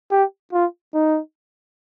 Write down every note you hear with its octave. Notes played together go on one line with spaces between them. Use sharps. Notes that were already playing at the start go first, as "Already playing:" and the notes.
G4
F4
D#4